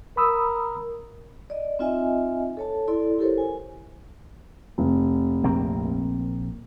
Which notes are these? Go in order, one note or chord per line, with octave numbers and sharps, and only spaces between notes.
A#4 B5 D#6 E6
D5 D#5
C4 D#4 F4 D#5 E5 G#5
A4 C#5 A5
E4 A4 D5 C6
E4 G4 A4 A#4 C5 C#5
G#5
F1
A#1 A#3 C4